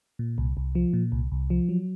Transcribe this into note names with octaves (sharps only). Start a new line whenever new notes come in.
A#2
C2
C2
F3
A#2
C2
C2
F3
F#3